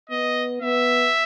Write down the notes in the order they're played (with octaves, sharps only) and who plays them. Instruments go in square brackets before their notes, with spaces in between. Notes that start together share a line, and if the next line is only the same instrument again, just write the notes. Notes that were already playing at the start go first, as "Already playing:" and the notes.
[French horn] B3 [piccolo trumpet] D#5
[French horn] B3 [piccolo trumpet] E5